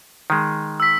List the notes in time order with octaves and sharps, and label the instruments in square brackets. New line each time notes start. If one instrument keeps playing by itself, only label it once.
[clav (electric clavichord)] D#3 G#3
[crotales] E6 B6